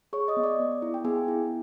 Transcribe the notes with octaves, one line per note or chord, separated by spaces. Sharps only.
G#4 C#5 C#6
D#5 D#6
B3
D5 D6
B3
E4
G5
B3 G#4 G#5
E4